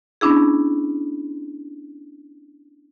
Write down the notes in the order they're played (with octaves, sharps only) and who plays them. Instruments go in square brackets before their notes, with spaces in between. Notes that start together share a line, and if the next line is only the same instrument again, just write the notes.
[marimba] B3 C#4 D4 E4 G#4